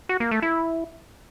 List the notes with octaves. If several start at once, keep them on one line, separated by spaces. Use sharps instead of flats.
F#4
A#3
A3
E4